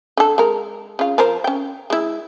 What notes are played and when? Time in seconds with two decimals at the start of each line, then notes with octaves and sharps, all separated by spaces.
0.17 D3 A4
0.38 G#3 A#4
0.99 C#3 F4
1.18 F3 A#4 C5
1.44 C#4 G5
1.90 G#3 E4